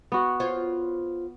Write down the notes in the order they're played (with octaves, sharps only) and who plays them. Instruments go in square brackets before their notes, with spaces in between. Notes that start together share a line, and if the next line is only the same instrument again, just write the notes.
[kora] B3 F#4
[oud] F4 C5 C#5